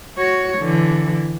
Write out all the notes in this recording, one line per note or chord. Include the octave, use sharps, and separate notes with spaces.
F#4 C#5
D3 E3